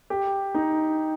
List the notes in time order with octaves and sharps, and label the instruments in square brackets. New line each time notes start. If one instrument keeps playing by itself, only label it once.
[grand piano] G4
D#4